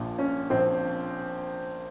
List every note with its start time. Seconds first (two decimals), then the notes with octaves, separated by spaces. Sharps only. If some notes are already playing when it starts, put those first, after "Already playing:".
Already playing: A#1 A#2 F3
0.19 C#4
0.50 A#1 A#2 F3 C4